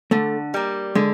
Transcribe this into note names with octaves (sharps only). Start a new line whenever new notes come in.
D3 A3
G3 A#3
D3 G#3